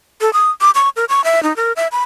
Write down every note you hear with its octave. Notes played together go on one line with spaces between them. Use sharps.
A4
D#6
D6
C#6
A#4
C#6
E5
D#4
A#4
E5
B5